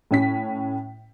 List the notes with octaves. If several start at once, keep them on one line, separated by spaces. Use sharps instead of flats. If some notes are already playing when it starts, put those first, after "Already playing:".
A2 C#4 B6